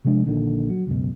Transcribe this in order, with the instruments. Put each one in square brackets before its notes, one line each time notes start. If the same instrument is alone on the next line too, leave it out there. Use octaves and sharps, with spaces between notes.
[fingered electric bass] C3 F3 G#3 D4
A#1 A#2 D3 D#3
F#3
C#2 F#2 B2